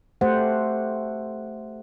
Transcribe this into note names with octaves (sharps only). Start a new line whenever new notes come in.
A3 G4 C5 F#5